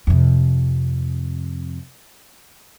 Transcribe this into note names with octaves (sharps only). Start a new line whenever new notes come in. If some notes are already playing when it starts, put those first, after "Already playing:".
F2 C3